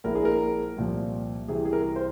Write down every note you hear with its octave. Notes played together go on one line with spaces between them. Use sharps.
A#1 A#2 G#3 E4 A#4
G#4
A#4
C2 A#2 F3
C2 C3 E3 G#4
G#4
A#4
C5